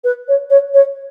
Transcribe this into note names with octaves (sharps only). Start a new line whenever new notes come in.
B4
C#5
C#5
C#5